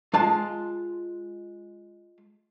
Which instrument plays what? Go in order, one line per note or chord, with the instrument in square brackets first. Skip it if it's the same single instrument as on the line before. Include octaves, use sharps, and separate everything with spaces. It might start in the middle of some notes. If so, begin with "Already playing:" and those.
[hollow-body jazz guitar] G#3 F4 A5